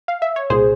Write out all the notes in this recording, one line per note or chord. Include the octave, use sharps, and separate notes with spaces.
F5
E5
C#5
C2 A#2 G#4 C5